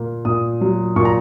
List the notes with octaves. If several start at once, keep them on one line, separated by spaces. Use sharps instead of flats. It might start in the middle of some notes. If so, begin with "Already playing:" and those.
Already playing: A#2 A#3
A#2 D#6
F#3
A#2 C#6
A#5